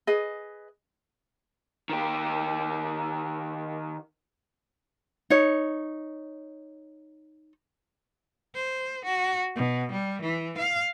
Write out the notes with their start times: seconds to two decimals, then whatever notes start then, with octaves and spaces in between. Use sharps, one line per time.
0.07 G#4 B4 D#5
1.90 D#3 G4
5.30 D#4 C#5
8.55 C5
9.05 F#4
9.56 B2
9.92 G3
10.22 E3
10.58 F5